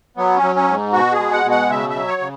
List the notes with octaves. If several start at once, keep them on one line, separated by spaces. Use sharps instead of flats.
F#3 B3
C#4
F#3
C#4
G#2
B2 F#4
G#4
G#3
F#5
B2
F#5
C#3 E5
E5
F#3
C#5
C#3